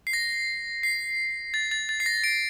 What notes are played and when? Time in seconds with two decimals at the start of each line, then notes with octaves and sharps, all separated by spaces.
0.07 C7
0.13 A#6
0.83 C7
1.54 A6
1.71 A6
1.89 A6
2.00 C7
2.06 A#6
2.24 D7